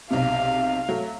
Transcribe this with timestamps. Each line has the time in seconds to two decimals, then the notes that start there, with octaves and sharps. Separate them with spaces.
0.11 B1 C3 F5
0.89 F#3 A3